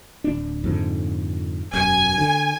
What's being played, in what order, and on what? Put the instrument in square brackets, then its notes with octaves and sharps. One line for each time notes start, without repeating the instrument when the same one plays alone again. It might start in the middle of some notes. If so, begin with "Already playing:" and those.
[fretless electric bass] D1 D4
F2 G#2 D3
[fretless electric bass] E1 F#2 [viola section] G#5
[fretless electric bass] D3